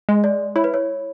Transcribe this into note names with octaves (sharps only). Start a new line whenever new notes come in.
G#3
D5
E4 C#5
B4
C#5